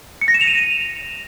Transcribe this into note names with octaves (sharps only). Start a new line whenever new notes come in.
C#7
A#6
E7
F7
D#7